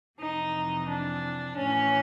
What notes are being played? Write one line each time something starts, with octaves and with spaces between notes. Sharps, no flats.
F2 C3 E3 D#4
D4
A2 E3 C#4